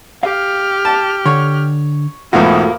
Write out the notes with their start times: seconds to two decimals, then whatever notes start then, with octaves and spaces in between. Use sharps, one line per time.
0.23 G4 F5 F6
0.85 A5
1.26 D3 C#5
2.33 B1 E2 G#2 A3 A#3 F4 F#4